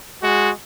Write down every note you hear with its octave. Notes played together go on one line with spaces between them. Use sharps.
G#3 F#4